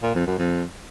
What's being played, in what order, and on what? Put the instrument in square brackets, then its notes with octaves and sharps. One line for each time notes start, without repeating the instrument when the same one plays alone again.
[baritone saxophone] A#2
F2
F#2
F2